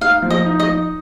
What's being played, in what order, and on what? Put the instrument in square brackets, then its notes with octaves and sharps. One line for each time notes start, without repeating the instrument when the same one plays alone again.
[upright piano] D#4 [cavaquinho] F5
[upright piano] F3
[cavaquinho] D#5
[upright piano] D#4
[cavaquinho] D#5
[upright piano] D#4